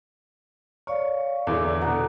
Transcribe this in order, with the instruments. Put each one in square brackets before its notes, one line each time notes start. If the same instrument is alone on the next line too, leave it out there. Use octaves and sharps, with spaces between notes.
[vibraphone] C#5 D5 F5 [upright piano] C#6
[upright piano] E2 D3 E3 [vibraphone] D5 D6
[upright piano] B2 D3 F#4 [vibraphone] A#5